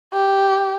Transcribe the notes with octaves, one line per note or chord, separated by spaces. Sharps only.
G4